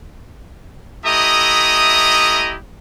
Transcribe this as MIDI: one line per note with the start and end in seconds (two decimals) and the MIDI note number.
1.06 2.57 57
1.06 2.57 64
1.06 2.57 67
1.06 2.57 75
1.06 2.57 82
1.06 2.57 87